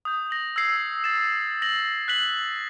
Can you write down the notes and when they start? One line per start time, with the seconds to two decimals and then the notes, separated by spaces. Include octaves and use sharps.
0.05 D#6 G6
0.31 A#6 F#7
0.56 E6 G#6 C7
1.04 A6 E7
1.62 A#6 F#7
2.08 F#6 B6 F#7